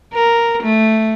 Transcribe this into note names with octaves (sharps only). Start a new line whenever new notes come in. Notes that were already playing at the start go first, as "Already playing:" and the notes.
A#4
A3